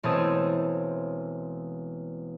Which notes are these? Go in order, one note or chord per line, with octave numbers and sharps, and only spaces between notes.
E1 A3 C4 C#5 A5 D#6